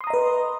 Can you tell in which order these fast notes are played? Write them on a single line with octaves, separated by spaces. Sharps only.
C6 D#6 A#5 D#5 B4